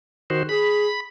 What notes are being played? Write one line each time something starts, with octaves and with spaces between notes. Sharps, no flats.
D#3 F#4 C5
G#4 B5